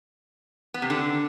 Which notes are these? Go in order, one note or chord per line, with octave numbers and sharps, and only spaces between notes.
B3
C3
D3